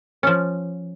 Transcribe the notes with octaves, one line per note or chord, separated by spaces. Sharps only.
F3 C#4